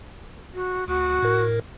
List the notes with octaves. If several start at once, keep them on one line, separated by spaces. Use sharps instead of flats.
F#4
D2 F#4
A2 A#4